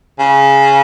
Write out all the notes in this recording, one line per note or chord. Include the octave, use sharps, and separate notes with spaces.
C#3